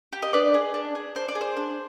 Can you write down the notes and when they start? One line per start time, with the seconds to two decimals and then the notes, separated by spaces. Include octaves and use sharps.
0.13 G4
0.22 D#5
0.33 D4 B4 D5
0.54 G#4
0.74 D4
0.95 G#4
1.15 D4 C5
1.28 D5
1.35 G#4
1.41 C5
1.57 D4